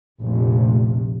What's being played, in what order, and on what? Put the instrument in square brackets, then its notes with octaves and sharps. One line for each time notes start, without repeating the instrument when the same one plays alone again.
[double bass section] F1 A#1 C3